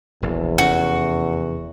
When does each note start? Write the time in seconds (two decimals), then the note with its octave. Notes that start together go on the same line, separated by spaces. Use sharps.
0.22 E1 A#1 E2
0.58 F1 C#4 F#4